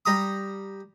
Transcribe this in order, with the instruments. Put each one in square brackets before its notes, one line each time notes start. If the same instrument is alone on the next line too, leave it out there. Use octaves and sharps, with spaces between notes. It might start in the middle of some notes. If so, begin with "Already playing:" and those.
[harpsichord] G3 A#5 D#6